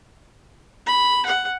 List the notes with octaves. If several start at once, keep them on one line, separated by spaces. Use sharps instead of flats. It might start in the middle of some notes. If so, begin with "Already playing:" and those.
B5
F#5